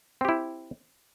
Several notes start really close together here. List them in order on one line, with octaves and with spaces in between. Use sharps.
C4 G4 E4